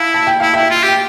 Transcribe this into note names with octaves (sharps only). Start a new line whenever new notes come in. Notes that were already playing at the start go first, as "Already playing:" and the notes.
Already playing: E4 F5 A5
A5
G5
E4 F5
E4 E5 G5
F4
G4 G5